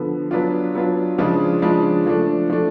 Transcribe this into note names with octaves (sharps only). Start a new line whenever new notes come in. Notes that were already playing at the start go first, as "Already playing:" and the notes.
Already playing: D3 F3 B3
F#3 B3 D4 F4
F#3 B3 D4 F4
C#3 F3 G#3 D4 F4
C#3 F3 G#3 D4 F4
F3 A3 D4
F3 A3 D4